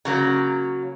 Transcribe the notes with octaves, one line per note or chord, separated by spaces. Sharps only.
C#3 F#3 A#3